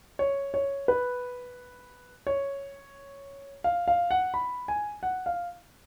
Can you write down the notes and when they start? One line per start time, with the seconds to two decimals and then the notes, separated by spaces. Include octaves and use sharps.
0.19 C#5
0.54 C#5
0.88 B4
2.27 C#5
3.64 F5
3.88 F5
4.11 F#5
4.34 B5
4.68 G#5
5.03 F#5
5.26 F5